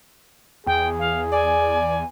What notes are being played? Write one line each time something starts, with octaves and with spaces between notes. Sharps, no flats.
E2 G#4 G5
F5
D5 G#5